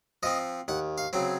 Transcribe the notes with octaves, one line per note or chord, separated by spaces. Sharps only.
F3 C4 D#5
D#2 F#5
F5
C#3 F#3 C4